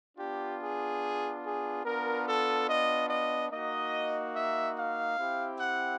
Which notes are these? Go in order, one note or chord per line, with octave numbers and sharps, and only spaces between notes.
B3 D4 F4 G4
G#4
G#4
B3 D4 F4 A#4
A4
D#5
D#5
A#3 D#4 F#4 D#5
E5
F5
C4 E4 G4
F#5